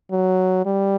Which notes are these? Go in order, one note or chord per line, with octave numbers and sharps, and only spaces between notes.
F#3
G3